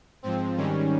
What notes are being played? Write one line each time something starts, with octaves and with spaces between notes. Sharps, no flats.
G#2 F3 C4
G#2 D#3 G3 C#4